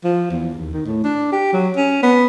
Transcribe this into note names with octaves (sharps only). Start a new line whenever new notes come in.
F3
E2
D#2
D#3
A2
D4
G4
F#3
C#4
B3